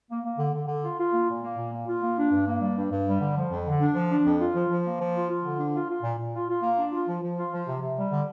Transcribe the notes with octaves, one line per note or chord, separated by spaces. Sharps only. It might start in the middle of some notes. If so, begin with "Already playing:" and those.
A#3
A#3
D3
D3
D3
F4
F4
A#3
A#2
A#3
A#2
A#3
F4
A#3
D4
G2
A#3
G3
G2
G2
G3
D3
F3
F2
D3
D4
F3
D4
F2
F4
F3
F3
A#3
F3
F4
F4
D3
D4
F4
F4
A#2
A#2
F4
F4
A#3
D4
F4
F3
F3
F4
F3
C3
C3
G3
D3